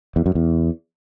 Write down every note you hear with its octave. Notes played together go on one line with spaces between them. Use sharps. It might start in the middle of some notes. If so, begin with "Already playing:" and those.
E2
F#2
E2